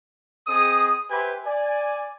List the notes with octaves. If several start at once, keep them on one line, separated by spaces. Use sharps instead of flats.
C4 G#4 D#5 D#6
G4 B4 C5 E5 G#5 B5
D5 G#5